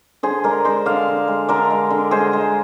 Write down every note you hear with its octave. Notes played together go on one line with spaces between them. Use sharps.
D3 G#4 C5
G#3 A#4 D5
G#3 C5 D#5
D3 D5 F5
D3
G#3
D3 A#4 D5
G#3
D3
G#3 G#4 C5
G#3